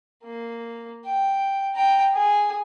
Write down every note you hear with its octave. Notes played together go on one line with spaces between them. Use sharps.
A#3
G5
G5 A#5
G#4